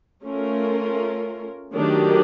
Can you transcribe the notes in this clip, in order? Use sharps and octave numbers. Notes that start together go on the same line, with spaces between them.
A3 C#4 F4 A#4
D#3 F#3 A3 D4 G4